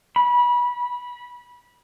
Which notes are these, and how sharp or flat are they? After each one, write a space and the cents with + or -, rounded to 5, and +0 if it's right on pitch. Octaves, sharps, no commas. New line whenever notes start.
B5 -25